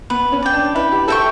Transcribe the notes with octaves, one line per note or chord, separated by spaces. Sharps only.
B3 B4
C#4
D5 G5
D4
E4 B4
G4
A4 E5 G5 C#6